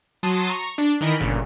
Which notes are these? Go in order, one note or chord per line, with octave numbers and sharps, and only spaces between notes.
F#3 A5 C6 D#6 D#7
A#5 C#6
D4
D#3 E3 A#4 D#5 B5 D7
G1 A#2 C#3